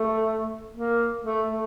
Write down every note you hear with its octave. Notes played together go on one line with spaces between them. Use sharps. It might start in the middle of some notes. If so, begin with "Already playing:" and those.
Already playing: A3
A#3
A3
A3